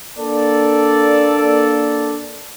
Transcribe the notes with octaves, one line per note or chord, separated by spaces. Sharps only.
A#3 D4 A4 D5